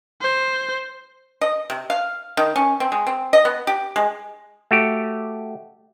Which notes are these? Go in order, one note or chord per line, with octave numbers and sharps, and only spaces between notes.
C5
D#5
C3
F5
D#3
C#4
C4
G#3
C4
D#5
B3
G4
G#3
A3 F#4 G4